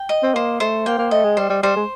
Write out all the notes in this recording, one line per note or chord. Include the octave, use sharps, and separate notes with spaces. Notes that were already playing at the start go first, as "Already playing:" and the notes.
Already playing: G5
D#5
C4
A#3 C5
A3 C5
A#3 G5
A#3
A3 D#5
G#3
G3 C5
G3
G3 C5
G#3